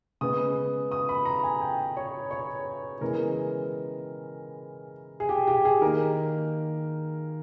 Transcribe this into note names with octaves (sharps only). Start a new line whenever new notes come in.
C#3 G#3 B3 D#6
D#6
B5
A#5
G#5
G5
C#5
C#5
C#3 E3 G#3 B3 A#4
G#4
G4
G4
G#4
D#3 A#3 A#4